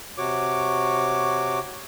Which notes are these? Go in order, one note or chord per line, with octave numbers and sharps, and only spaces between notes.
C3 F#4 C#5 D6